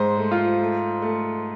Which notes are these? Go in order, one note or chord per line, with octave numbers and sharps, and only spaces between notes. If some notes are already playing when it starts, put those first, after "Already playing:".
Already playing: G#2 C5
A3
F4
A3
A3